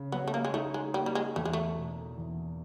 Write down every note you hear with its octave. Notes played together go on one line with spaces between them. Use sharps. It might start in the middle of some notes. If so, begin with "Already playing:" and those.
Already playing: C#3
F#3 B3
A3
A#3
G#3
A3 D#4
G#3
G3 A#3
G3
G#3
E2 A3
G#3
A3
B2
E2